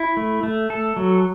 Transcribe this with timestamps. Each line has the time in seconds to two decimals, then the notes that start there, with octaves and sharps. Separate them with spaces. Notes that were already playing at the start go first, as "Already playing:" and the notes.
Already playing: E4
0.17 A3
0.43 A3
0.70 A4
0.96 F#3